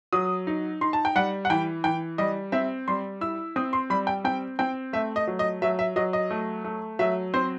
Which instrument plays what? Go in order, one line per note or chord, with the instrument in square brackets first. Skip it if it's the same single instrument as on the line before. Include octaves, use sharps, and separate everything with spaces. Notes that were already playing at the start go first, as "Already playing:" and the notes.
[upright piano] F#3 D#6
D#4
D#4 C6
A5
G5
G3 F#5
F#5
E3 G5
E3 G5
G3 D#5
C4 E5
G3 C6
E4 E6
C4 D#6
C6
G3 B5
G5
C4 G5
C4 G5
A3 E5
D#5
F#3
D#5
F#3 E5
E5
F#3 D#5
D#5
A3
A3
F#3 E5
C4 C5